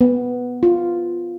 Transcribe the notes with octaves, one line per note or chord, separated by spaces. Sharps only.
B3
F4